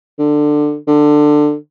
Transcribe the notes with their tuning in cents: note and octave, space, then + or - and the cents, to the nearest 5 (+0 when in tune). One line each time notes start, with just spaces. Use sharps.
D3 +15
D3 +15